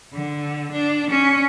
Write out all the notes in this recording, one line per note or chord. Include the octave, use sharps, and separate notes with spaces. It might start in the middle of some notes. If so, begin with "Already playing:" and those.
D3
D4
C#4